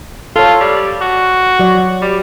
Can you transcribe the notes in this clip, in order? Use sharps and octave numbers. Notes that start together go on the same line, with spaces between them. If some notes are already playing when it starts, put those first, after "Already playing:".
F4 A4 C#5
G3
F#4
F#3 D5
G3